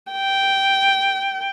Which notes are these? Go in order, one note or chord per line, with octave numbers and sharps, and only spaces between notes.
G5